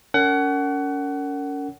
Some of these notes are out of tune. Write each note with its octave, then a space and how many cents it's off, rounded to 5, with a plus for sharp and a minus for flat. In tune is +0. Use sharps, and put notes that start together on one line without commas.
C#4 +30 A#4 -30 F#5 +25